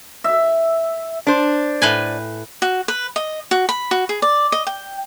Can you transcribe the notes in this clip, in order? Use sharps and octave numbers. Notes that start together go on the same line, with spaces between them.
E5
D4 C5
A2 B4 G#5
F#4
B4
D#5
F#4
B5
F#4
G#4
D5
D#5
G5